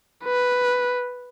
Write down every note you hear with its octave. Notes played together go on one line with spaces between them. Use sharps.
B4